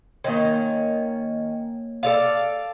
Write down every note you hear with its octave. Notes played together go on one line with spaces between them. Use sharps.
D#3 A#3 C#4 C#5
A4 D5 F5